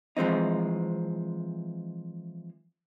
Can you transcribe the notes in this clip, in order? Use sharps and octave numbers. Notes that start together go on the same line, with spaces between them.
E3 F3 G#3 C4 D#4